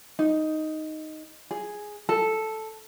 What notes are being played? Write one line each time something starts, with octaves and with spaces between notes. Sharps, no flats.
D#4
G#4
A4